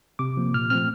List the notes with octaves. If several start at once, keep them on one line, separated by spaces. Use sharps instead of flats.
C3 D6
F3 A#3
A#2 F6
F3 A3 C4 F6